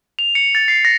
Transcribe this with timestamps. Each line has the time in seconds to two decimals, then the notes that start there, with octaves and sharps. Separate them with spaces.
0.19 F7
0.35 C#7
0.55 A6
0.68 C7
0.85 A#6